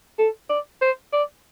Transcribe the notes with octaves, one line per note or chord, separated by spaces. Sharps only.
A4
D5
C5
D5